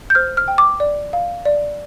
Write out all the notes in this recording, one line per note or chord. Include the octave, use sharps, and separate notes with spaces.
G6
C5 F6
F6
G5
D6
D5
F5
D5